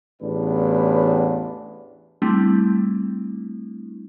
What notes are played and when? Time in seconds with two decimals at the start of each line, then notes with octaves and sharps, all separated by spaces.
0.22 A1 E2 A2 D4 B4
2.22 G3 A3 C4 D4 E4